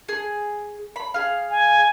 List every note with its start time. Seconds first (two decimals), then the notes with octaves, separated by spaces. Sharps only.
0.09 G#4
0.96 B5
1.14 G#4 F5
1.50 G#5